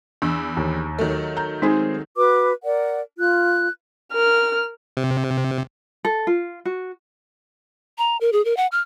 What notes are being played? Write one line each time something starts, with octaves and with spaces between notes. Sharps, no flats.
E2 D4 E6
D#2
D#3 F#3 A3
A#5 G6
G#3 C4 D#4 G#4
F#4 B4 D6
A#4 D5 F#5
F4 F#6
A#4 F6
C3
A4
F4
F#4
A#5
A#4
G#4
A#4
F#5
F6